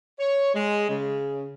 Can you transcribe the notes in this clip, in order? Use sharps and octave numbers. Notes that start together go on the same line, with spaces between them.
C#5
G#3
C#3